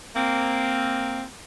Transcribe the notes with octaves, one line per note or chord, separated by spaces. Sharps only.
A#3 C4